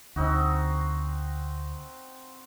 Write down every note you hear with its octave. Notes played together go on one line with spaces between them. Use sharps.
D2 C4 D#4 F#4